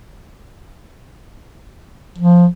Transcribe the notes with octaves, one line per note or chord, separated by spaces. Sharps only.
F3